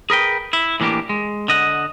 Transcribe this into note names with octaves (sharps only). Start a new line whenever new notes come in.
G#4 A#4 B4 G5
E4
A2 E3 A#3 D4 G4
G#3
D3 D#5 F#5